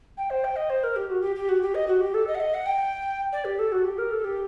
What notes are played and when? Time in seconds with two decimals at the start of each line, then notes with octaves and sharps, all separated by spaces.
0.17 G5
0.30 C5
0.44 G5
0.56 D#5
0.70 C5
0.83 A#4
0.96 G4
1.10 F#4
1.22 G4
1.35 G4
1.49 F#4
1.62 G4
1.75 D#5
1.87 F#4
2.01 G4
2.14 A4
2.27 D#5
2.35 F#5
2.40 D#5
2.54 F#5
2.66 G5
3.32 D5
3.45 G4
3.59 A4
3.72 F#4
3.84 G4
3.98 A#4
4.11 A4
4.24 G4